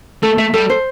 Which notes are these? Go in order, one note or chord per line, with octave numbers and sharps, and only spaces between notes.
A3 A4
A3 E5
G3 A4
C5